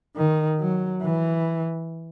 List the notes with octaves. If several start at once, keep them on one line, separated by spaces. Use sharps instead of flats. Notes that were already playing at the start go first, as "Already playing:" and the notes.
D#3
F#3
E3